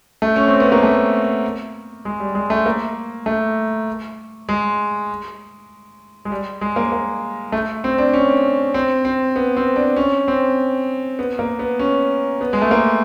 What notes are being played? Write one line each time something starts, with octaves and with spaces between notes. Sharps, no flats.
A3
C#4
C4
B3
A#3
A3
G#3
G3
G#3
A3
A#3
A3
G#3
G#3
G3
G#3
A#3
A#3
A3
C4
D4
C#4
C4
C4
B3
C4
D4
C#4
C4
B3
A#3
B3
C#4
B3
G#3
A3
A#3